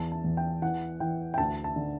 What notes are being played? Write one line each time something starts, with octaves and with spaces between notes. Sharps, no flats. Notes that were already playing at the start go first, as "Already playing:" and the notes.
Already playing: E2 A5
A5
E2
G5
E3 F#5
E3 G5
G5
D2 A5
A5
D3